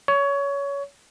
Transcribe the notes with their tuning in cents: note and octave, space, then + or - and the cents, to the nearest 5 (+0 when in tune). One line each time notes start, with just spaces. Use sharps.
C#5 +20